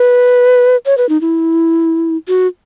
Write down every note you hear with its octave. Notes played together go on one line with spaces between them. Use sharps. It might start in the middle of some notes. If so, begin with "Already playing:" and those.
Already playing: B4
C#5
B4
D#4
E4
F#4